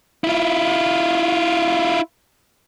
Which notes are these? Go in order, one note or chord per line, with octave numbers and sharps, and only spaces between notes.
E4 F4